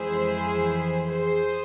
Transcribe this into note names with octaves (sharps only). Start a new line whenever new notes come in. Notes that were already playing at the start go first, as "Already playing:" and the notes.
Already playing: F2 E3 G#3 E4 G#4 C5
G#4 C5